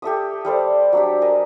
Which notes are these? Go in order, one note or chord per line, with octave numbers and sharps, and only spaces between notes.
G4 A4 E5 D#6
G3 A4 C5 D5
F#3 D4 G4
A#4 D#5 G#5